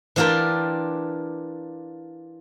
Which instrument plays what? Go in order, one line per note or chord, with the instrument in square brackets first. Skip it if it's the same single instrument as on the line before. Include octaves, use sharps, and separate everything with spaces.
[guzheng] E3 D4 F4 G4 A#4